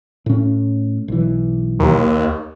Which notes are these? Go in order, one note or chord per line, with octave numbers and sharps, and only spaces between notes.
A2 C#4
B1 E3
D#2